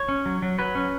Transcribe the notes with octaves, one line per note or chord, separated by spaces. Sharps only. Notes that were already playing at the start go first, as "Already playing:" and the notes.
Already playing: C#5
C#4
F#3
F#3
F#3 B4
C#4